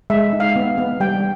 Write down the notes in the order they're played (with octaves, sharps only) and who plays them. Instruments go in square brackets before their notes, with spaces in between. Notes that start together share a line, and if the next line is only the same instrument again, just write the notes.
[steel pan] G#3 E5
D#4
F5
B3
B3
G3 G5